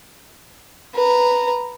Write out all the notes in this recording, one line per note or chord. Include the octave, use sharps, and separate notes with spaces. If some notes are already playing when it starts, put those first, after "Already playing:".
B4 A#5